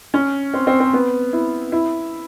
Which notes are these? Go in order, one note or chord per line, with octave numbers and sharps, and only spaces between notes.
C#4
C4
C4
C4
B3
E4
E4